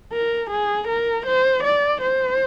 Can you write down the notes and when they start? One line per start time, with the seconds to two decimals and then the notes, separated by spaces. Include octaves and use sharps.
0.13 A#4
0.51 G#4
0.88 A#4
1.27 C5
1.64 D5
2.02 C5